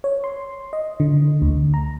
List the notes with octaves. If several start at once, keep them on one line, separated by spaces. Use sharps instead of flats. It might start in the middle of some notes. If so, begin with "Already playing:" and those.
C#5
C6
D#5
D3
D2
A#5